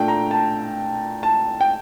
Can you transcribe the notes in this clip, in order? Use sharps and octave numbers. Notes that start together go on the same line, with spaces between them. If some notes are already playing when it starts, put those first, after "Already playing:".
Already playing: A#2 A3 D4 G5
A#5
A5
A5
G5